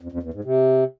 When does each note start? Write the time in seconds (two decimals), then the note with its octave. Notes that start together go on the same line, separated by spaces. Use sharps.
0.01 F2
0.12 F2
0.23 E2
0.34 G#2
0.44 C3